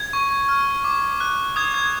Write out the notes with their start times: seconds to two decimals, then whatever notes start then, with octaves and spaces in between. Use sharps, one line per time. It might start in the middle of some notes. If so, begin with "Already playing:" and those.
Already playing: G#6
0.13 C#6
0.49 F6
0.84 D6
1.20 F#6
1.56 D#6 G#6
1.74 G#6